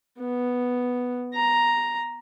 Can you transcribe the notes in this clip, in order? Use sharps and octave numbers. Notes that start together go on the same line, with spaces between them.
B3
A#5